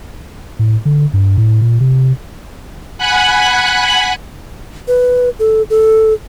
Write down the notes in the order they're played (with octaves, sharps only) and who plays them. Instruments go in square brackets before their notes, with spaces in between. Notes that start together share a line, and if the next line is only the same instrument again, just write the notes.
[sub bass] A2
D3
G2
A2
A#2
C3
[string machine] F#5 G#5 B5 F#6
[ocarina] B4
A4
A4